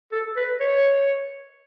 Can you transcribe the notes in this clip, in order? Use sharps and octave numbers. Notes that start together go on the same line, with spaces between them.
A4
B4
C#5